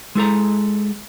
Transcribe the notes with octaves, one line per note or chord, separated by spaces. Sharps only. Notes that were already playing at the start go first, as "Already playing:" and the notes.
G#3 E4 A4 A#5